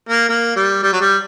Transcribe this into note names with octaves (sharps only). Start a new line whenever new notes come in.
A#3
A#3
G3
G3
F#3
G3